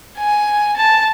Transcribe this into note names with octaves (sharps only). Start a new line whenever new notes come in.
G#5
A5